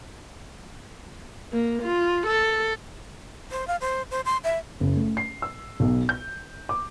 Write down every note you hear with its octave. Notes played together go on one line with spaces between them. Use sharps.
A#3
F4
A4
C5
F5
C5
C5
C6
E5
F#1
A3
C7
E6
B1
G6
D6